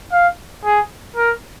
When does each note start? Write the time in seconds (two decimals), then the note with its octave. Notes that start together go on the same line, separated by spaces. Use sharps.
0.12 F5
0.65 G#4
1.17 A#4